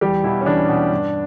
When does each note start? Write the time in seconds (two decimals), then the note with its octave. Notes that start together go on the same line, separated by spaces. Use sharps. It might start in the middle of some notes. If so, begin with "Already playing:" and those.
0.01 E2 G3 G4
0.23 B2 E3 E4
0.41 C#4
0.46 E2 D4
0.68 B2
0.90 G2